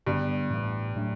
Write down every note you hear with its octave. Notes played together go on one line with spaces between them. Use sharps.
G2 D3 G3 B3
A2 E3 B3 D4
A2 F#3 A3 D4